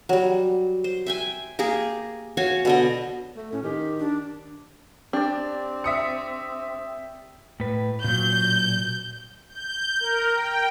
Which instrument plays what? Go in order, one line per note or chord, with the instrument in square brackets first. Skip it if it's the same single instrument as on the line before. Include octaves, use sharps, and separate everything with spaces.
[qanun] F#3 G3
C5
E5 G5 G#5
A#3 G4 G#4 A#4
F#4 C#5 F5 G#5
B2 D3 D#5
[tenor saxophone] A3
[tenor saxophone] A2 [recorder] C#4
[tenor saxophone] D#3 [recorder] G4
[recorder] D4
[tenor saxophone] C4 [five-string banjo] D4 [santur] G4 D5
[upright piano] E5 D#6 C#7
[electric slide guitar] A2 B4
[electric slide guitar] A#2 F#3 [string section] G6
[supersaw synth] G6
A#4
G5